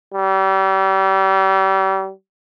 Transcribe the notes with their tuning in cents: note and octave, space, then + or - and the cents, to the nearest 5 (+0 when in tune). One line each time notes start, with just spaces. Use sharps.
G3 -35